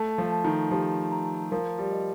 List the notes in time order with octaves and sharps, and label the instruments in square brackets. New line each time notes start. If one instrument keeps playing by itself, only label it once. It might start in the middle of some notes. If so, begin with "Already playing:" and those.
Already playing: [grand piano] A3 [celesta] A5
[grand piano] F3
[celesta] A5
[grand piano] D#3
[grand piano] F3 [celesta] G4
[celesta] A#5
[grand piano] F3 [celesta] A#4
[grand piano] G3
[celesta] D#5